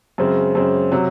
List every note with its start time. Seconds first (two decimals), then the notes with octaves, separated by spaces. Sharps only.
0.18 F#2 C#3 G#3 C4
0.55 F#2 C#3 G#3 C4
0.92 C3 F#3